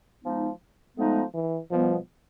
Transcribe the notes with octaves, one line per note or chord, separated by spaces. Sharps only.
F3 G#3 B3 D#4
F3 G#3 A3 B3 D#4
E3
B2 F3 G3 B3